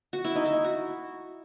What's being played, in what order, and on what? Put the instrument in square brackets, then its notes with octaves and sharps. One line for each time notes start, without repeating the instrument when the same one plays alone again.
[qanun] F#4
E4
D#4
E4
F#4